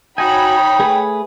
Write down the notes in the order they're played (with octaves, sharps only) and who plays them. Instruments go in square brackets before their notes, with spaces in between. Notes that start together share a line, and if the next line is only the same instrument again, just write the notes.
[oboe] D#4 [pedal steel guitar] F#4 G#5 [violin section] C#5 B5 [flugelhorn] G5
[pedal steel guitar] A3 G#4 B4